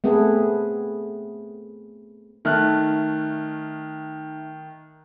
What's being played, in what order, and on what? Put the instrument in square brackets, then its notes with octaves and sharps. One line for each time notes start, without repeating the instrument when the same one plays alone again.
[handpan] A3 B3 C4 G#4 A4 B4
[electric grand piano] D#3 F6 F#6 [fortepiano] A3 A5 [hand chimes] D#4 E5